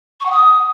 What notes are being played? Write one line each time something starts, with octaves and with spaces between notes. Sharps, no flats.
C#6
F#5
D#6